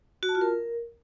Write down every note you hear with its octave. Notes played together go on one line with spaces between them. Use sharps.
F#4
A5
F4
A#4